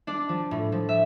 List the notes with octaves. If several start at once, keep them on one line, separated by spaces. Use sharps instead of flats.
D4 D5
F3
A2
F3
E5